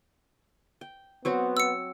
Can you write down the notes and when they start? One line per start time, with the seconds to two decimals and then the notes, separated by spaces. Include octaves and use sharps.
0.81 G5
1.25 F#3 B3 C4 F#4
1.57 E6 C#7